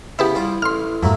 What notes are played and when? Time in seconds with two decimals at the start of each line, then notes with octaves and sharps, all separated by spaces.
0.19 C#3 B3 E4 G4 B4 E5
0.35 G3 F4 D6
0.62 A1 C6 F6
1.03 F2 G#2 F#3 A3 A#3